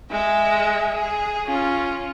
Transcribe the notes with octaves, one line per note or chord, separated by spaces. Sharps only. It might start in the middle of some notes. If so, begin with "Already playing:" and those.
G#3 E5
G#4
C#4 F4